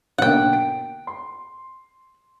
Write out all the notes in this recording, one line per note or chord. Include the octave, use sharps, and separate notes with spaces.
B1 D3 A#3 F#5 G5
D7
C6